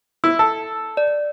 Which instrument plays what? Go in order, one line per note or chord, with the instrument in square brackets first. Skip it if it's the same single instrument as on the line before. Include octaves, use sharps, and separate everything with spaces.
[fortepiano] E4 [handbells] E6
[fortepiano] A4
[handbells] D5